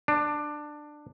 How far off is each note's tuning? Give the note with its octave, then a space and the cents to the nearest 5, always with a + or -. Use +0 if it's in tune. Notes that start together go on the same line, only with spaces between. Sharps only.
D4 +15